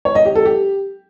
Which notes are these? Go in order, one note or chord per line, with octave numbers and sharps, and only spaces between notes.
C#5
D#5
G4
A4
G4